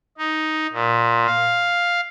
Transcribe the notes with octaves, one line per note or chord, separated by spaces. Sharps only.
D#4
A#2
F5